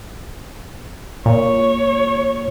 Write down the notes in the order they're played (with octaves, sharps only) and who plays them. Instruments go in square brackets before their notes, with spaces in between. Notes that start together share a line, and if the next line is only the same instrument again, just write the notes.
[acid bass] A#2 [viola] C#5